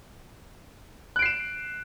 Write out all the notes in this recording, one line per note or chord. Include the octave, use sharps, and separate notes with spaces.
F#6 C7 D7 E7